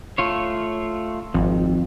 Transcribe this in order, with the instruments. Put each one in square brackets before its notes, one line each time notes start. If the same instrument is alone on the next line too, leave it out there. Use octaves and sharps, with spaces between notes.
[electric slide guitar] A3 F4 C#5
[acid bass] G#1 [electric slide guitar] F2